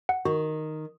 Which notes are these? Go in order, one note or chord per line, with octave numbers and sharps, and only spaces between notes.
F#5
D#3 F#4